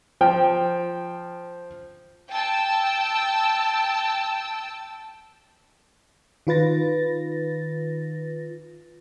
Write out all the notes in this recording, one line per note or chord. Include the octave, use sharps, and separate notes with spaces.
F3 G5
G5 A5 E6
D#3 F4 B4 A6 A#6